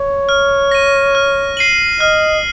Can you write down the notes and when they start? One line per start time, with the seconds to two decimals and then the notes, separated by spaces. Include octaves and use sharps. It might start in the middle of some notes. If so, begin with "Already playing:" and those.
Already playing: C#5
0.29 F6
0.71 A#6 D#7
1.15 F6
1.57 C7 D#7 F#7
2.00 D#5 F6